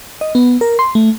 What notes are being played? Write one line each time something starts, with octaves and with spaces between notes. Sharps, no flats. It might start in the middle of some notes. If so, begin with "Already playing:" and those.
D#5
B3
A#4
C6
A3